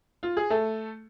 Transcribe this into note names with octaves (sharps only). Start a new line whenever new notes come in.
F4
G#4
A3 A4